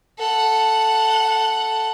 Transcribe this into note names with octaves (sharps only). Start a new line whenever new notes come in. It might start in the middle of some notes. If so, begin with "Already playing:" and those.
A4 F#5